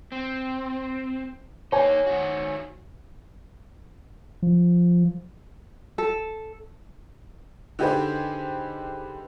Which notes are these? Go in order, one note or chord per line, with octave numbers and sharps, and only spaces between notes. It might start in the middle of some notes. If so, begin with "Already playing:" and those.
C4
A#3 D#4 C#5 G#5
D#3 F#4
F3
A4
D3 D#4 G4 G#4 B4 C5